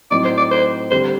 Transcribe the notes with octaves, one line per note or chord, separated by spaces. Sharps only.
A2 F#3 C4 D#4 D5
C5
D5
C5
D3 G3 C4 C5